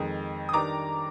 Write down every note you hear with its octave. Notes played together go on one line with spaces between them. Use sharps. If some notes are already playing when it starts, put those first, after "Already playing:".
Already playing: F2 D#3 G#3 D#4
D#6
D#3 G3 D4 A#5 D6